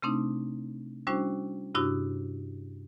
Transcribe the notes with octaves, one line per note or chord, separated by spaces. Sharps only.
C3 A3 C4 D4 D#4
G3 C#4 D4 E4 F#4 C5
G2 C3 D4 E4 F#4 D#6